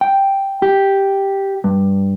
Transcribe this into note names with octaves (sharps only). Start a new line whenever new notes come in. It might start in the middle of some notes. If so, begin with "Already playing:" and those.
G5
G4
G2